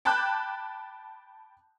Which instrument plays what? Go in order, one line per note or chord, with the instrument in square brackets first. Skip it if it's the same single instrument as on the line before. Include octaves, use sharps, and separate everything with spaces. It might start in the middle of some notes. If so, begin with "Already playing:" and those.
[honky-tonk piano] G5 A5 B5 D6 F#6 G6